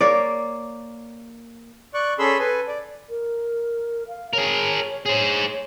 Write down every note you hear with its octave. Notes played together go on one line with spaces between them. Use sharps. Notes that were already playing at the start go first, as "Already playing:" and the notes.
A#3 C#5 D5
D5 C#6 F#6
C#4 G#4 A4 B5 C6 E6
A4 B4 G#5
D5
A#4
F5
G#4 A#4 C#5
G#4 C5 C#5